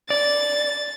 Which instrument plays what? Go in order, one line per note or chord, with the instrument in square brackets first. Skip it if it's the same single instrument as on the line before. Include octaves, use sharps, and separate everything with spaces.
[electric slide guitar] D5 [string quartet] A6